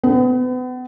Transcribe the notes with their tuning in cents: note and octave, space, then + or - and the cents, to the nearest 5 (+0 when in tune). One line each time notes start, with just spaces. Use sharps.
B3 +35